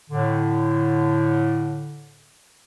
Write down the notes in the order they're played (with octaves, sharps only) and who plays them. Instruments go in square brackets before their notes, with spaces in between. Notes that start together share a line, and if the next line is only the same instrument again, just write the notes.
[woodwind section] A2 D3